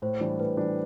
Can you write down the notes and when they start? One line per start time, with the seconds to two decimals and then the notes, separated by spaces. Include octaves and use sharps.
0.02 A2 C5
0.21 E3 G3 D4
0.39 A2 B4
0.57 E3 G3 D4